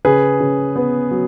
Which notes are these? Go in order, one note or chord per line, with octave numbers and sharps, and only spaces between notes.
C#3 G#4 B4
C#3
B3
F#3